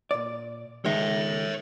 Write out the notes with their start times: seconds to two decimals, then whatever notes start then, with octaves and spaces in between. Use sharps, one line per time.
0.11 A#2 D5
0.85 C#2 D#3 G#3 C#5 E5